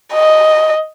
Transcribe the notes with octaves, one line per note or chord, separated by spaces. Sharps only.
D#5